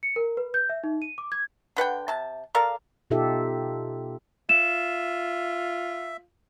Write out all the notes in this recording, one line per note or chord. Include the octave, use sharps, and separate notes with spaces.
C#7
A#4
B4
G6
E5
D#4
D#7
D6
G#6
D3 B4 F#5 G5
C3 A5
A4 A#4 D5 F5
B2 D#4 F4 G4 A4 E5
F4 E5 E7